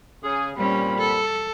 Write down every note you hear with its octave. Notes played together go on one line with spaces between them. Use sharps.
C#3 G#4
A#2 G3 C4 C#4 B5
A4